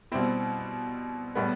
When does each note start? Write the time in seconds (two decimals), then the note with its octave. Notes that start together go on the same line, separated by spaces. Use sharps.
0.12 B2 G3 C4 E4
1.35 A2 G3 B3